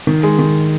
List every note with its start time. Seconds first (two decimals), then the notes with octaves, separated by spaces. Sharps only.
0.07 D#3
0.23 G#3
0.39 D#3